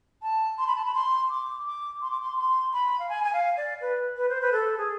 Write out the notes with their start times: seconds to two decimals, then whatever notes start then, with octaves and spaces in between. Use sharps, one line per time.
0.22 A5
0.58 C6
0.67 B5
0.76 A5
0.86 B5
0.94 C6
1.30 D6
1.65 D6
2.02 C6
2.11 D6
2.21 C6
2.38 C6
2.73 B5
2.99 F5
3.09 G#5
3.24 G#5
3.33 F5
3.57 D5
3.81 B4
4.17 B4
4.29 C5
4.41 B4
4.52 A4
4.78 G#4